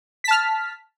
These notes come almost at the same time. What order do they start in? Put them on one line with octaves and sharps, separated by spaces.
B6 A5 F6